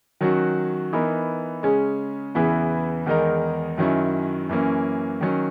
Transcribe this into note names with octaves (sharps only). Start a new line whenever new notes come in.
D#3 F#3 C#4 F#4
E3 B3 D#4 A#4
C#3 G#3 C#4
E2 C#3 E3 B3 E4
E2 D#3 G#3 D#4 A#4
F#2 D#3 F#3 C#4 E4
F#2 E3 A#3 C#4
D#3 F#3 C#4